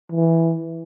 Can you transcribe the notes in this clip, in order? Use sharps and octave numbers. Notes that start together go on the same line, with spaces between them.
E3